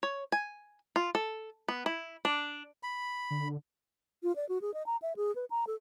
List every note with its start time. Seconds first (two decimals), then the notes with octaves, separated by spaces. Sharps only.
0.03 C#5
0.32 G#5
0.96 F4
1.15 A4
1.68 B3
1.86 E4
2.25 D4
2.83 B5
3.31 D3
4.23 F4
4.36 D5
4.49 F#4
4.61 G#4
4.74 D#5
4.86 A#5
5.02 E5
5.16 G#4
5.35 B4
5.50 A#5
5.67 A4